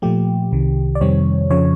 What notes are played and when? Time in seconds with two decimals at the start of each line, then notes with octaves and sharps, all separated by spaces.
0.02 A#2 F3 A3 G4
0.52 C2 C3 D#3
0.95 D5
1.01 F2 C3 D#3 G3 C4 C#5
1.50 F2 C#3 F3 C#5